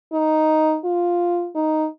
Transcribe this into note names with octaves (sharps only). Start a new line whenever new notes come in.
D#4
F4
D#4